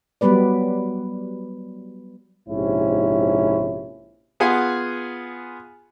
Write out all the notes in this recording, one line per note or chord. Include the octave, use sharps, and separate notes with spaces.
F#3 G3 B3 B4 D5
A#1 G#2 C3 C#4 E4
B3 F4 G#4 F#5 G#5